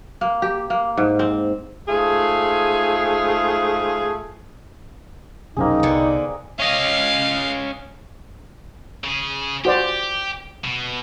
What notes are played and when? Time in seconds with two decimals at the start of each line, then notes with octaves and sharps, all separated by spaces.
0.21 A#3
0.42 G4
0.70 A#3
0.97 G#2
1.19 C4
1.88 G#2 A3 F4 G#4
5.56 F1 B1 A#3 C4 C#4 D#4 G#4
5.83 C2 D3 B3
6.59 C#4 D#5 F5
9.04 C#3 G#4
9.65 F#4 G4 C5 D5
10.64 B2